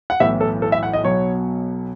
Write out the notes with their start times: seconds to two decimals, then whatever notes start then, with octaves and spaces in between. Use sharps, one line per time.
0.10 F#5
0.20 B1 A2 E3 E5
0.41 A4
0.62 A4
0.72 E5
0.83 F#5
0.93 D#5
1.04 B1 B2 F#3 C#5